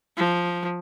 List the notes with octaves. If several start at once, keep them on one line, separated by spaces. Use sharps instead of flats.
F3